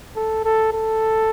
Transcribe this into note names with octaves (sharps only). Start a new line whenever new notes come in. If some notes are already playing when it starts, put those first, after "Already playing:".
A4
A4
A4